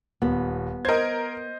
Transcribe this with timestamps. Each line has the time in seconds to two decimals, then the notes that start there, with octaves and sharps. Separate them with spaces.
0.22 D#1 B3
0.85 A#4 C5 D#5 G#6